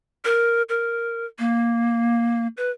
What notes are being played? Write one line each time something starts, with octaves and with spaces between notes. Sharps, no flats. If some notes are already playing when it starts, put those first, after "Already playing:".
A#4
A#4
A#3
B4